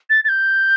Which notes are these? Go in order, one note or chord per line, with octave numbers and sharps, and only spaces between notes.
A6
A6
G6